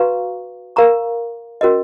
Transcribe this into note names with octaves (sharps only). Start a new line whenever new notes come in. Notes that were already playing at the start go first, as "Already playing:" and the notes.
Already playing: F#4 B4 F5 A#5 C#6
A#4 F5 A#5 C#6
C#4 F#4 A#4 D#5